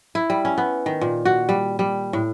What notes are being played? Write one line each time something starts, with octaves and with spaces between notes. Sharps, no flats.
E4
G3
C#4
B3
D#3
A#2
F#4
G3
G3
A2